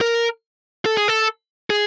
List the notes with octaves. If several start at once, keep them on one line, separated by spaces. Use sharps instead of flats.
A#4
A4
G#4
A4
G#4